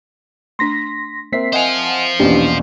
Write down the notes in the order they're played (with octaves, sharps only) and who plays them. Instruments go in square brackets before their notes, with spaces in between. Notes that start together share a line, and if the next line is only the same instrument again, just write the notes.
[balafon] A3 D4 [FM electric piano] C6 A#6 B6
[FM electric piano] A#3 B6 C7 [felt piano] C4 A#4 E5
[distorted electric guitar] C5 F5 [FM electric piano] D#5 F#5 G#5
[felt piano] A#1 E2 B2 [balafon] A#3 C#4 [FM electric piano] D4 E4 G4